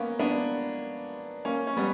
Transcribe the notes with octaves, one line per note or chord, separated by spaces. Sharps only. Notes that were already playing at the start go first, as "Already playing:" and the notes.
Already playing: A#3 B3 C#4
B3 D4
A#3 C#4
C#4
G3 B3